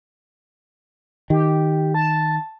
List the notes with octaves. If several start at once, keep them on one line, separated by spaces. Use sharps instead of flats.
D#3 G4
A5